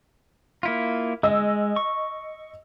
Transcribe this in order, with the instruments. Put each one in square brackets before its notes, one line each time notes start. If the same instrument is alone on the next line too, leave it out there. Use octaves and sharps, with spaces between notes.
[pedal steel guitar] A#3 E4 F4
[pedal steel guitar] G#3 [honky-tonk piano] D#5 E6
[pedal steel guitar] C#6